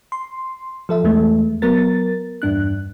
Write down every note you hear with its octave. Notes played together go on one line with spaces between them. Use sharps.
C6
F3 A4 E5
E2 E3 G#3 A3
F#3 B3 A#4 A6
E2 G2 D4 F#6